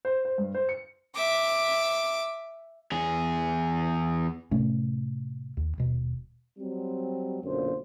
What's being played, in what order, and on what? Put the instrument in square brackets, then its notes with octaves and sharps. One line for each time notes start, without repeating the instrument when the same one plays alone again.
[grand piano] C5
C5
G2
C5
C#7
[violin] E5 D6
[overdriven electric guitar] E2 G#4
[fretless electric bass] A2 C3 A3 C#4
D#2
D#1 B2
[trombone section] F#3 G3 C4
B1 F#2 A#2 D3 C5